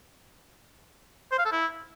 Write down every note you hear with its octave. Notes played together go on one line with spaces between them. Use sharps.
C5
F5
A4
E4